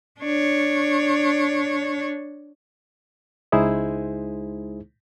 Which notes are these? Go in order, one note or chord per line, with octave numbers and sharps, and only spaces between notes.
D4 C#5
C#2 G#3 D#4 E4 G#4 C5